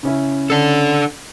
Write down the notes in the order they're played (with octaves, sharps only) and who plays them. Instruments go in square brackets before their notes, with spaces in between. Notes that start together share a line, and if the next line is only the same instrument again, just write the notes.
[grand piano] C#3 C#4 E4
[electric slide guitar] D4 A4